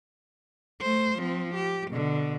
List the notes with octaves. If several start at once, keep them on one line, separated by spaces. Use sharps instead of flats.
A3 C5
F3 C4
G4
B2 D3